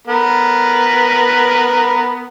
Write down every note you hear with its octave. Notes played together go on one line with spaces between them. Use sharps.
B3 A#4 B4